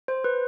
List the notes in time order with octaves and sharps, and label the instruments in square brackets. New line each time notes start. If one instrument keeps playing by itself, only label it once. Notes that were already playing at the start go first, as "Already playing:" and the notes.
[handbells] C5
B4